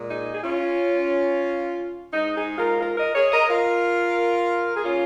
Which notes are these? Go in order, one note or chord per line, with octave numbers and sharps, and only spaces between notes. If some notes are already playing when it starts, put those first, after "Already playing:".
Already playing: A#2 G#3
D#4 G#4
G#4
C#4 F4
G#2 G#3 D#4
D#4 G#4
F4 A#4
F4 A#4
A#4 D#5
G#4 C#5
A#4 D#5
F4 A#4
G#4
C#3 A#3 C#4 F4